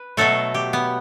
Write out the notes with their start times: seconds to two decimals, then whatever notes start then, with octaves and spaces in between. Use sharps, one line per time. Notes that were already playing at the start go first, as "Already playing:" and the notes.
Already playing: B4
0.17 B2 F#3 A3 A4
0.54 G4
0.73 B3